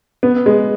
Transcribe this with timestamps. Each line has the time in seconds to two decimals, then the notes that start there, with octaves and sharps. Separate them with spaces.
0.23 B3
0.46 G#3